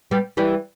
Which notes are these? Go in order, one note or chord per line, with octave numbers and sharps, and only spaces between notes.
G3 B3
E3 G3